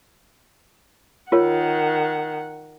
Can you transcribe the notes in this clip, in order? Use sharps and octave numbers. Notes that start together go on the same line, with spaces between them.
D#3 F4 A#4 C#5 F#5